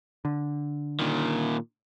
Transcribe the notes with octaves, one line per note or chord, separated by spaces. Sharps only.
D3
A#2 D#3